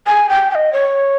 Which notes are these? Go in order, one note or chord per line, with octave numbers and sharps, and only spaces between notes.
G#5
G5
G5
D#5
C#5